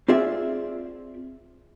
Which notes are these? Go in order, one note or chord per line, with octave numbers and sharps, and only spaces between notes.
C4 F4 G#4 D5 E5